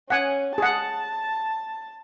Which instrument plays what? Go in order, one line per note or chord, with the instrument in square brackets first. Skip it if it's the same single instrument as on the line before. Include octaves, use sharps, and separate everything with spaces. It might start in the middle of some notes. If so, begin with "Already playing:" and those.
[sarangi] C#4 [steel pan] F#5 G#5
[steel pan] G#4 F#5 [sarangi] A5